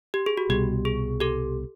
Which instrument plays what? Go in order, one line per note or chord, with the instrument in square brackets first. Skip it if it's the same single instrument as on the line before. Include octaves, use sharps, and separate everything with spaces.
[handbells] G4
G#4
F#4
[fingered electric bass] C2 B2 G3 [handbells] G4
[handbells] G#4
G4 A4